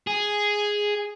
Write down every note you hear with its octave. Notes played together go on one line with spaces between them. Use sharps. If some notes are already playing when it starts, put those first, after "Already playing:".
G#4